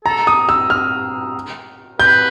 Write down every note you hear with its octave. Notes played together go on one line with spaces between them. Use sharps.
A4 A#5
D#6
E6
F6
B4 G6